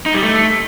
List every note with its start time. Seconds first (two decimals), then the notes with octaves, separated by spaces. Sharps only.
0.06 D#4
0.14 G3
0.23 A3